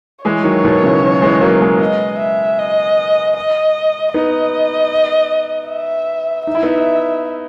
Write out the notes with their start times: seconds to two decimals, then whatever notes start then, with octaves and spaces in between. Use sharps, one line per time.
0.25 E3 G#3 C#5
0.44 D#3 F#3
0.63 B2 D#3
0.83 C#3 E3
1.02 D#3 F#3
1.22 E3 G#3
1.41 F#3 A#3
1.61 G#3 B3
1.80 D#5
2.19 E5
2.58 D#5
3.36 D#5
4.14 B3 D#4 D#5
5.69 E5
6.47 D#4 E5
6.55 E4
6.63 B3 D#4